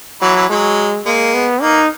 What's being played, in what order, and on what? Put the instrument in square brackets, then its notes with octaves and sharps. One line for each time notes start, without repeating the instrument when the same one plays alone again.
[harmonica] E3 [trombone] F#3
[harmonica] E3
[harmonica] F#3 [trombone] G#3
[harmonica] G#3 [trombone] A#3
[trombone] B3
[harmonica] A#3 [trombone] D#4